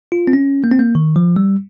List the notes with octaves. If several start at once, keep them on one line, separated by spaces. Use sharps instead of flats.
F4
C4
C#4
A#3
C4
A#3
D#3
F3
G3